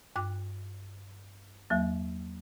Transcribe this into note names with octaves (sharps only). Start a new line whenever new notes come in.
G2 G5 D6 F#6
E2 F#3 A#3